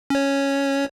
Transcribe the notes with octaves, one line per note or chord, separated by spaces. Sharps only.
C#4 C#5